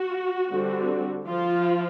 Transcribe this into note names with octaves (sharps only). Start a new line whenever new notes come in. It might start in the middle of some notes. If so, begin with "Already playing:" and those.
Already playing: F#4
D3 G3 C4
F3 F4